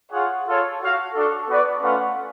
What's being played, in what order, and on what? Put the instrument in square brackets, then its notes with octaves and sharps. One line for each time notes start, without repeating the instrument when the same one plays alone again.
[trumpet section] F4 G#4 C#5 F#5
F4 A4 C#5
F#4 C#5 F5
D4 F#4 A4
B3 F#4 B4 D5
A3 C#4 F4 B4 F#5